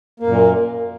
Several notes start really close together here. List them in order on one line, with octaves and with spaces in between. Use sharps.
A#3 F#2 A#2